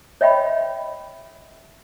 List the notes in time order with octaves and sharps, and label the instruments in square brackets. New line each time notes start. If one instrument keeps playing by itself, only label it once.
[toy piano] C#5 D#5 E5 G5 B5